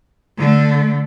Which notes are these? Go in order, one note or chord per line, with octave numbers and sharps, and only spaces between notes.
D3 A3